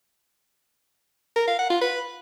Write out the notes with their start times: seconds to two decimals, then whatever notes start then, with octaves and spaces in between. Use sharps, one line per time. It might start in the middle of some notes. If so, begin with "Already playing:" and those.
1.36 A#4
1.48 F5
1.59 F#5
1.70 F4
1.81 B4